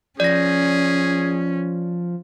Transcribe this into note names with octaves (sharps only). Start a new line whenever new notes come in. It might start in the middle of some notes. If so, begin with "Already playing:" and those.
F3 C#4 G#4 D5 A#6